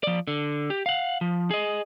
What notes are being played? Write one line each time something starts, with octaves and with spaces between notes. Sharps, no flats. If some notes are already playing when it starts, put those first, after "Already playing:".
F3 D5
D3
G4
F5 F#5
F3
G#4 D#5